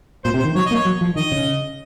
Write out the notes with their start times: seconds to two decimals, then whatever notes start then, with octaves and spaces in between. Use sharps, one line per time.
0.24 A#2 C5
0.34 C3
0.39 C5
0.44 D#3
0.55 F#3 C#5
0.66 D#5
0.71 A#3
0.75 C#5
0.85 F#3
1.01 F3
1.16 D#3 D#5
1.32 C#3